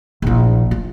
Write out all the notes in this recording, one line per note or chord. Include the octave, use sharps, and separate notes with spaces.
A#1 E4
F4